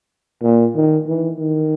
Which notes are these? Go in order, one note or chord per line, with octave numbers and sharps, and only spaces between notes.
A#2
D#3
E3
D#3